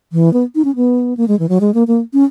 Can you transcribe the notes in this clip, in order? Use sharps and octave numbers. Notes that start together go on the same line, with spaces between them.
E3
B3
D#4
C#4
B3
A#3
G#3
E3
F#3
G#3
A#3
A#3
C#4